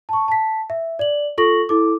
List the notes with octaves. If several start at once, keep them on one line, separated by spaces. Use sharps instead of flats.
A5 C#6
A5 B6
E5
D5 F#7
F4 A4 C#6 A#6 F#7
E4 A4 D6